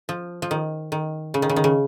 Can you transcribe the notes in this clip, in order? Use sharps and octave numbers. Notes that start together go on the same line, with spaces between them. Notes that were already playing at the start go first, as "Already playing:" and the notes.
F3
F3
D#3
D#3
C#3
D#3
C#3
D#3
C#3